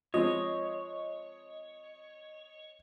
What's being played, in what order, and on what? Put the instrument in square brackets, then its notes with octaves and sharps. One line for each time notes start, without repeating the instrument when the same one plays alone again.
[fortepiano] F3 G#3 C4 [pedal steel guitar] C#5 [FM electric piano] D#5